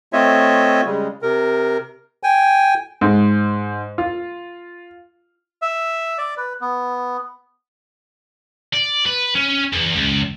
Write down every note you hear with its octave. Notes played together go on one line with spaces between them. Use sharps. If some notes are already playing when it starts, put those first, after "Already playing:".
A3 C4 F4 C#5 D#5 E5
C#3 G3 G#3
C3 A#4
G5 G#5
G#2
F4
E5
D5
B4
B3
D5
B4
C#4
E2
C#2